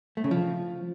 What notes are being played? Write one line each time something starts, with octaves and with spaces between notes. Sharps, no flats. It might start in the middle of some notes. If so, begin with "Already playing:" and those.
A3
C#3
F3